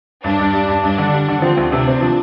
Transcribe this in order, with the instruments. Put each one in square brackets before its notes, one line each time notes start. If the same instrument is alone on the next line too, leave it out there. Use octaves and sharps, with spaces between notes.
[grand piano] G2 [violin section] D4
[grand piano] G2
G3
G2
[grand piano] G2 [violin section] D4
[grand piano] D3
G3
D3
[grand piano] F3 [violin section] C4
[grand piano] D2
[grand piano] C3 [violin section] D4
[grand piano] C4
F3